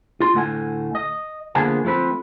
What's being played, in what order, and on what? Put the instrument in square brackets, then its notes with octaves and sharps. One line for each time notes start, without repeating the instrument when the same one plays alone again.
[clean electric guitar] F4 C6
D2 A2 A3 F#5 G#5
D#5
D3 F3 A#3 B3 D4 G#4
F3 A3 C4 B4